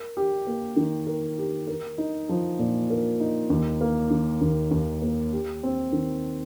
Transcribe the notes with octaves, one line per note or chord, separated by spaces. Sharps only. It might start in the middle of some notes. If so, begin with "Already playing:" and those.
Already playing: A#4
G4
A#3
D#3
A#4
G4
A#4
D#4
F3
A#2
A#4
D#4
D#2
A#3
D#3
D#2
D#2
A#3
G4
C4
D#3